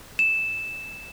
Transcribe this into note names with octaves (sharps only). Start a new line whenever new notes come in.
E7